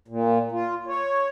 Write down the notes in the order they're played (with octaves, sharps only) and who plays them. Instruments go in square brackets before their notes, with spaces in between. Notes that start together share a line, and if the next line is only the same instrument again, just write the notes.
[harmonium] A#2
F4
C#5